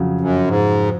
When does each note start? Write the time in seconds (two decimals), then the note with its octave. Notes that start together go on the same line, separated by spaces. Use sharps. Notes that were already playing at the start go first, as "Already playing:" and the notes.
Already playing: F2 C#3 F#3
0.21 F#2
0.47 G#2